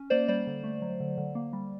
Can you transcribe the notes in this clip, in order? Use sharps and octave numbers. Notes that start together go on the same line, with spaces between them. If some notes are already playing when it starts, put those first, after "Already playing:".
Already playing: C#4
A#3 C5 D5
G3 C5 D5
D3
A3
F#3
D3
D3
A#3
G3